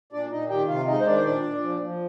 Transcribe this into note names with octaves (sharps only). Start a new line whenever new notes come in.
A#2 D4 D5
A#2 D#4 D#5
D#3 G4 G5
C3 F4 F5
G#3 D#4 D#5
C5
D#3 D4 D5
C5
A#2 D4 D5
A#2
F3
F3